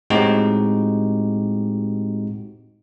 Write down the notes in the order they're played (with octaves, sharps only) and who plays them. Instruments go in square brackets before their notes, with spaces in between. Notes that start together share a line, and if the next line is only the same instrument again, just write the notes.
[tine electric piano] A2 G#3 C4 D#4 F#4 G4